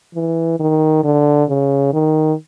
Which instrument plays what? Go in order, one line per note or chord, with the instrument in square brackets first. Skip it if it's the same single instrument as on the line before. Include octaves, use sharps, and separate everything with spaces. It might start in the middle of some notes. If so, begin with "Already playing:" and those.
[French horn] E3
D#3
D3
C#3
D#3